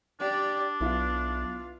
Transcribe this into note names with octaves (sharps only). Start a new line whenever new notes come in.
D4 G4 D5
B1 B3 E4 F4